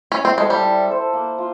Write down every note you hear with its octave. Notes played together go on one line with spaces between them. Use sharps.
C#4 E4
C4
G#3 A4 C5
G3
E4
A4 C5
A#3
F4